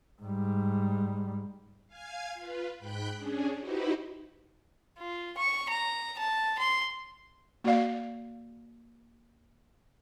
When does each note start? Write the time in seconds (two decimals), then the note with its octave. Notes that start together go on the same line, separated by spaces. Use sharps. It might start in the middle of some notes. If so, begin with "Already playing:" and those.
0.22 G#2 G3
1.87 F5 G#5 G#6
2.34 F4 B4
2.79 G#2 G5 B5 F#6 G6
3.14 C#4 D4 G#4
3.58 D#4 E4 F#4 G4 B4 C5
4.99 F4
5.37 C#6
5.70 A#5
6.18 A5
6.58 C6
7.64 A#3 F#4 C#5 D5 F5